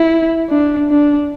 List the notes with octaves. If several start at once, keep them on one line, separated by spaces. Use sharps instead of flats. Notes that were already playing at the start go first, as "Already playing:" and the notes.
Already playing: E4
D4
D4